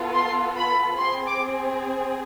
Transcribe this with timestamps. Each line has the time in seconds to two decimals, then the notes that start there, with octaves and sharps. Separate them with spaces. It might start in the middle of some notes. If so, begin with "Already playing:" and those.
Already playing: B3 F4 A4
0.14 C6
0.56 B5
0.98 C4 G#4 C6
1.26 D6